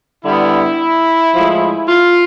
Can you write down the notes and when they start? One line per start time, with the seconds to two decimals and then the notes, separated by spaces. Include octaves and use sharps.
0.25 D3 G3 B3 E4
1.34 A2 F3 G#3
1.88 F4